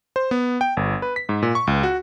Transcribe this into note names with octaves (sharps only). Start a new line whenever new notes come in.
C5
B3
G5
G1
B4
B6
G#2
A#2
C#6
C#2
F#4